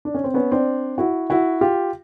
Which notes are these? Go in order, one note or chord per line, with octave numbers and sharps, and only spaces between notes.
D4
C#4
C4
B3 C#4
C4 D4
E4 F#4
E4 F#4
F4 G4